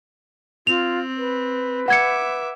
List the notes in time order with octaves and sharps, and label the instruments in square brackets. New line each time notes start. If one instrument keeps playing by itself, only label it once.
[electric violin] C4 [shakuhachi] F4 [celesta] F7
[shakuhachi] B4
[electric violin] E5 D6 [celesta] F#5 G#6 C#7